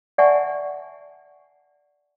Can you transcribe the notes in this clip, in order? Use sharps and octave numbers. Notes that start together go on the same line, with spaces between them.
D5 E5 F#5 G#5 A5 C#6